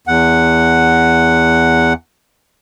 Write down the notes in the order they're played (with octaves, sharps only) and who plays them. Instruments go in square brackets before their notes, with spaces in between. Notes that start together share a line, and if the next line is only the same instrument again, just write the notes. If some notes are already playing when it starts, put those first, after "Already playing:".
[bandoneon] E2 F#5